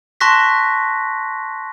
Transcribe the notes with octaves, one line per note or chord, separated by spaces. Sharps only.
A5 C6 C#6 F#6 A#6 B6